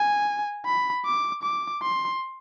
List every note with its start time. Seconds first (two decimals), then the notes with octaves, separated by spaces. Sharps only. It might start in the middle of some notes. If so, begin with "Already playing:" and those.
Already playing: G#5
0.65 B5
1.05 D6
1.43 D6
1.82 C6